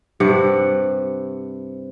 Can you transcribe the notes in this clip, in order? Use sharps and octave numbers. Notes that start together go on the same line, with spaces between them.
G2 C3 F#5